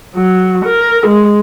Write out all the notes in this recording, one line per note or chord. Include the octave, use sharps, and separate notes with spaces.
F#3
A#4
G#3